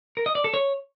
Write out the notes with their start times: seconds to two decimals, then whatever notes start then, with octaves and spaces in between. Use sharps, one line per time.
0.17 A#4
0.26 D#5
0.35 D5
0.44 A4
0.54 C#5